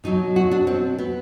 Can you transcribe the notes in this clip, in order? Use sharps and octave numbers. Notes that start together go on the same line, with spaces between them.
B2 F#3 D#4
F#4
D4
C4
B3